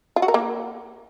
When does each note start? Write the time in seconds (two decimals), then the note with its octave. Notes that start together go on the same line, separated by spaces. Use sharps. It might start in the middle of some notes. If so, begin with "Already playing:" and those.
0.16 F4
0.22 F#4
0.28 A#4
0.34 A#3